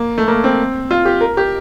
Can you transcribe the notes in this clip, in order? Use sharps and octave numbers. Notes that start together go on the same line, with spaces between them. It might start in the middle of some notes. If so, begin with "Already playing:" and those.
Already playing: A#3
A3
A#3
C4
F4
G4
A#4
G4